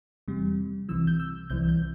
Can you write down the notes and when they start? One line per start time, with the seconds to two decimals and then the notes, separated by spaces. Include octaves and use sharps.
0.28 E2 C3 G3
0.89 C2 C3 E3 E6
1.07 G6
1.20 E6
1.50 C2 C3 E3 G6
1.69 G6